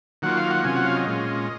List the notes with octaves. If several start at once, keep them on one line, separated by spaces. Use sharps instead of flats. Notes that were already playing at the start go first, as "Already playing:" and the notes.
D#3 F#3 A#3 F4 F#5
F5
F#5
C3 F#3 C#4 F4 G#5
F#5
F5
D#5
A#2 G#3 C#4 F4